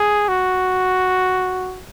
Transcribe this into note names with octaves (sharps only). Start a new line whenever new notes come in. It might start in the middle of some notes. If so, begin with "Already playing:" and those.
Already playing: G#4
F#4